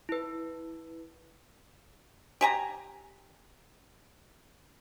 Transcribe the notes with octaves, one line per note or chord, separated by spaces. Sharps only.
E4 B4
G4 G#5 A#5